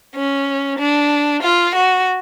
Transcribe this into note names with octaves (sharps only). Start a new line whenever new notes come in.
C#4
D4
F4
F#4